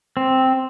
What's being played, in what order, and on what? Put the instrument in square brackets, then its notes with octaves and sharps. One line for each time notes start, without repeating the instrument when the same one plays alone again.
[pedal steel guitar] C4